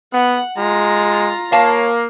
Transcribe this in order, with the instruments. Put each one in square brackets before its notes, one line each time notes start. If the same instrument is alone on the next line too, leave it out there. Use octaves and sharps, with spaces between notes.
[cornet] B3 [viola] F#5
[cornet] G#3 [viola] F4 A#5
[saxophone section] A#3 [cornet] C#5 [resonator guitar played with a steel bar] F5 A5